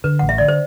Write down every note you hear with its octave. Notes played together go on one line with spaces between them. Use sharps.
D3 B4
A1 F#5
E5
D3 D5
C5